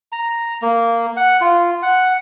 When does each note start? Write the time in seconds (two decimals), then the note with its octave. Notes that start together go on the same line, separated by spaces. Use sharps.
0.12 A#5
0.62 A#3
1.17 F#5
1.41 F4
1.83 F#5